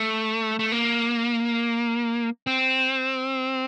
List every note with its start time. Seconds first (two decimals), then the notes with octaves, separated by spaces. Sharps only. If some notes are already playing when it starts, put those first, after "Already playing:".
Already playing: A3
0.59 A3
0.72 A#3
2.47 C4